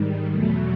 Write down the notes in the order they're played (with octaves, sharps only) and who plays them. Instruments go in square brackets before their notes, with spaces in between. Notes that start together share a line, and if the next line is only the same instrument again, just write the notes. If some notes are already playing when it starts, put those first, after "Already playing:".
Already playing: [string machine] G#2 D#3 G3
E2 B2 F#3 A3